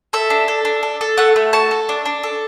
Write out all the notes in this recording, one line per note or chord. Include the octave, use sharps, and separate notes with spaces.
A4 E5
D4
A4
D4
A4
A4
A3 F#5
A3
F#4 A5
A4
D4
D4
A4